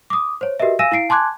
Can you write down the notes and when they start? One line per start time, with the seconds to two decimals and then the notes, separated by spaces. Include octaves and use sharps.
0.10 D6 D#6
0.41 C5 C#5
0.60 F#4 G4 A#4 B4 D#5 E5
0.79 F5 G#5 E6 A#6 D#7 E7
0.92 E4 F5 C7 D7
1.09 G#5 A5 C6 D6 F#6 G#6